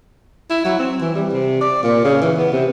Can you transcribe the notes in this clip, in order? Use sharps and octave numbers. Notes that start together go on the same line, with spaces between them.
E4
F#3
C4
E3
G3
C3
D5
A#2
C#3
E3
B3
C3